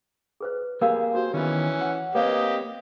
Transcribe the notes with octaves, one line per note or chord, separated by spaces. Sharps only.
G#4 B4 C5
A#3 G4 G#4 A#4 C5 F5
F#4 C5
D#3 E3 B3 C#4
F#5
A#3 C4 G4 B4 C#5 D#5 F5